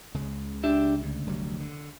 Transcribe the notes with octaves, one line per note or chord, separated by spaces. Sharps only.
C#2 C#3 G#3
D4 G4 E5
D2
F1 F#3 G3
D3